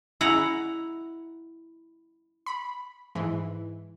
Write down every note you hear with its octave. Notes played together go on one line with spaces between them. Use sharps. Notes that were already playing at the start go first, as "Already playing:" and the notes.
E4 F#5 A#5
B5
G#2 E3